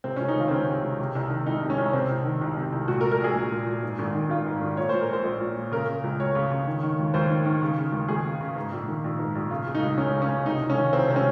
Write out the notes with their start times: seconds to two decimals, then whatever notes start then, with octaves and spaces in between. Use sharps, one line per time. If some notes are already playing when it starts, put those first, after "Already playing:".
0.04 C3 C4
0.16 C#4
0.21 C#2
0.28 D#4
0.36 D#3 F4
0.48 C4
0.51 C#2 C#4
0.67 C3
0.83 C#2
1.00 C3
1.15 C2
1.30 D#3
1.46 C2 D#4
1.62 C3
1.70 C#4
1.78 C2
1.93 C3 C4
2.10 C2
2.25 D#3
2.41 C2
2.57 C3
2.73 C2
2.88 A#2 F#4
3.01 A#4
3.04 A#2
3.11 A#4
3.20 A#1 G#4
3.35 A#1
3.52 A#2
3.67 A#2
3.83 G#2
3.99 G#1
4.15 D#3
4.30 G#1 F4
4.46 G#2
4.62 G#1
4.77 A#2 C#5
4.89 A#2 C5
5.01 A#4
5.10 A#1 C5
5.25 A#1
5.40 A#2
5.56 A#2
5.72 C#3 A#4
5.87 C#3
6.04 C#2
6.20 C#2 C#5
6.35 C#3
6.51 C#3
6.67 D#3
6.83 D#3
6.99 D#2
7.14 D#2 C5
7.30 D#3
7.45 D#3
7.62 C#3
7.78 C#3
7.92 D#2
8.08 D#2 G#4
8.25 C#3
8.41 C#3
8.55 G#2
8.72 A#1
8.88 D#3
9.04 A#1
9.19 G#2
9.35 A#1
9.50 C#3 F4
9.66 C#3
9.75 D#4
9.83 C#2
9.97 C#2 C#4
10.14 C#3
10.22 C#4
10.29 C#3
10.45 C3 D#4
10.61 C2
10.70 C#4
10.77 D#3
10.93 C2 C4
11.08 C3 C4
11.16 C#4